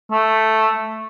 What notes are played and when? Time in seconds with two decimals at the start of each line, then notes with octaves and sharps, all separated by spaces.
0.12 A3